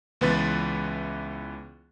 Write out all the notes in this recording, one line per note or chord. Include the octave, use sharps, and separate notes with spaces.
C#2 E3 B3 B4 C6 A6